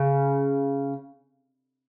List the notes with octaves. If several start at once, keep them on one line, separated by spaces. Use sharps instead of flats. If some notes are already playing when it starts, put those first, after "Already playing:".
Already playing: C#3